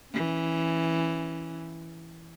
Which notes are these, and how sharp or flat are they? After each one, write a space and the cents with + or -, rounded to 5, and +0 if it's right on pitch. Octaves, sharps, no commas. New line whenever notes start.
E3 +0 C#4 +0